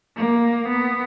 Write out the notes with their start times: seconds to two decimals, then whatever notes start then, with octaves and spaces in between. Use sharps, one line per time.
0.17 A#3
0.69 B3